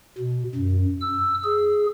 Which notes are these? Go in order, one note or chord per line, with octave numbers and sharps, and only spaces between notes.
B2
F#2
E6
G#4